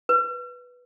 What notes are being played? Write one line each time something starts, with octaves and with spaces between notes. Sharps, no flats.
B4